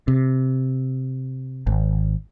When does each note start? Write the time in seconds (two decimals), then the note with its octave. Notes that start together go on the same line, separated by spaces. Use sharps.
0.08 C3
1.67 G#1